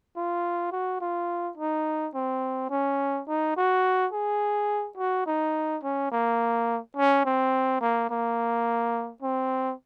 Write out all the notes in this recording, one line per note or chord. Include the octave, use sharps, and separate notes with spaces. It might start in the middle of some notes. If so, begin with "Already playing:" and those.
F4
F#4
F4
D#4
C4
C#4
D#4
F#4
G#4
F#4
D#4
C#4
A#3
C#4
C4
A#3
A#3
C4